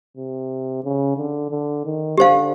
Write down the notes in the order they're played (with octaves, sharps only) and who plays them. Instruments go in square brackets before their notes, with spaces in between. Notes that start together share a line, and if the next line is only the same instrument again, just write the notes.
[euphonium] C3
C#3
D3
D3
D#3
[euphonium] D3 [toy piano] G4 C5 F5